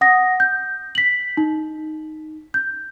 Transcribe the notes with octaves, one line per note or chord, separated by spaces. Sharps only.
F#5 D#6 A#6
G6
B6 F#7
D#4
G6